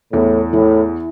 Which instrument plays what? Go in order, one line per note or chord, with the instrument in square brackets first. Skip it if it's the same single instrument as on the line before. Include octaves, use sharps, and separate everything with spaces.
[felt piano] E2 [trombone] A2
[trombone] A2 [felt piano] E3